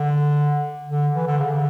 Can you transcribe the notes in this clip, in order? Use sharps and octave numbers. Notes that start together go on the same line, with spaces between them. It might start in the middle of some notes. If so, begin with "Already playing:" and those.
Already playing: D3
D3
E3
D3
C#3
D3